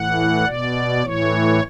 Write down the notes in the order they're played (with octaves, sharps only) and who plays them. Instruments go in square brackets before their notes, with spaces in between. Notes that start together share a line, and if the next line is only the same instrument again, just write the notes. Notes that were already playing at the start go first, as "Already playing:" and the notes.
Already playing: [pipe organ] A2 E3 F#5
B2 D5
A2 E3 C#5